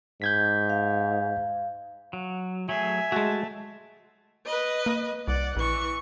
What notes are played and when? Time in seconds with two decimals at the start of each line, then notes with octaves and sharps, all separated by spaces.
0.22 G#2 G6 G#6 B6
0.70 F5
2.13 F#3
2.69 F#3 A3 G#4 E5 G#5
3.12 G#3 A3 F#4 A5
4.46 B4 D#5
4.86 A#3
5.28 C2 D5 F#5
5.56 A#1 E3 C#6